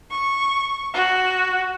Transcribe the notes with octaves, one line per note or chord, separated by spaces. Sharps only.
C#6
F#4